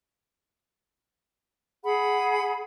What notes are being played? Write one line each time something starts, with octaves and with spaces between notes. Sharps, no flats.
G#4 F#5 B5